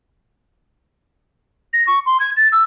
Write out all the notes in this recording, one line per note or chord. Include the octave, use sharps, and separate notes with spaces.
A#6
C#6
C6
G#6
A6
E6